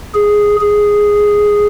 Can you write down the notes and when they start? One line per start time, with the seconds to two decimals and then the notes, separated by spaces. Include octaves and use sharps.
0.15 G#4
0.61 G#4